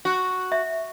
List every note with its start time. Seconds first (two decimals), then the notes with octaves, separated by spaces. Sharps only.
0.05 F#4
0.52 E5